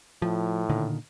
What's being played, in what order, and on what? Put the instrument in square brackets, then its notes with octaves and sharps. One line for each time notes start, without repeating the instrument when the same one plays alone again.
[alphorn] A2 [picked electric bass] F3
[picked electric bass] A#2 D3 D#3